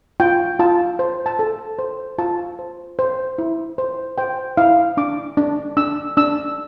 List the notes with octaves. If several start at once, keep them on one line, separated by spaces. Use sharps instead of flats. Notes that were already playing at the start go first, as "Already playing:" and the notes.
F4 G5
F4 A5
C5
A5
A4
C5
F4 A5
C5
C5
E4
C5
C5 G5
E4 F5
D4 D6
D4
D4 E6
D4 E6